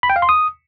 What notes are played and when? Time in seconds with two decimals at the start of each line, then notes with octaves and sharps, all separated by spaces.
0.03 B5
0.10 G5
0.16 F5
0.22 C6
0.29 D#6